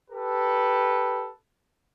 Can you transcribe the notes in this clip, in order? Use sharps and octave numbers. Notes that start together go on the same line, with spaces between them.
G4 A4 B4